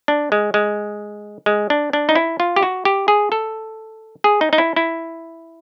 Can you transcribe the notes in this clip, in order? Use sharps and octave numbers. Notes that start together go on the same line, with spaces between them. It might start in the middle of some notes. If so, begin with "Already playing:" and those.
D4
G#3
G#3
G#3
D4
D4
D#4
E4
F4
G4
F#4
G4
G#4
A4
G#4
D#4
D#4
E4
E4